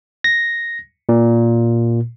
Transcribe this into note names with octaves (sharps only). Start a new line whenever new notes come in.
A#6
A#2